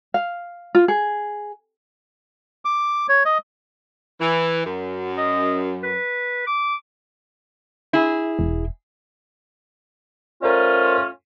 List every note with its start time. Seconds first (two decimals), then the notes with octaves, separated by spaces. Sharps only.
0.14 F5
0.75 F4
0.88 G#4
2.65 D6
3.09 C#5
3.25 D#5
4.21 E3
4.66 F#2
5.18 D#5
5.83 B4
6.47 D6
7.93 E4 G#4
8.39 E1
10.42 A3 C#4 F4 A#4 C5 D5